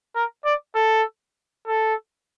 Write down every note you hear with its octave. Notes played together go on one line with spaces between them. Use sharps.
A#4
D5
A4
A4